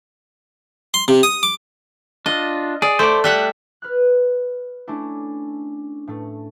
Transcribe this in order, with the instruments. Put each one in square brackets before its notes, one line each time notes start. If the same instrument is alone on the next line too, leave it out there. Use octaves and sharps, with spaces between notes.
[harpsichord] C6
C3
D#6
D6
[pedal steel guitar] D4 F4 [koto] D#5
[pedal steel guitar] G#4 [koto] D5
[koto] A3 [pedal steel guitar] C5 D5
[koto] G3 E5 F#5 [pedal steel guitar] F#6
[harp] B4 F6 F#6
A3 C#4 D4 E4
A2 A3